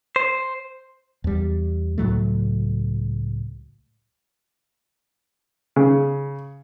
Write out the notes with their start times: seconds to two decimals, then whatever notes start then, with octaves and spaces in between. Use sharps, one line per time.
0.16 C5
1.24 E2 G3
1.98 C#2 A2 F#3 A3
5.76 C#3